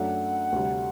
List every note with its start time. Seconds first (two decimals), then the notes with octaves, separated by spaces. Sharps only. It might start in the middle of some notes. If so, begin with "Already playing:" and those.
Already playing: F#2 F#3 A3 D4 F#5
0.52 D2 C3 G3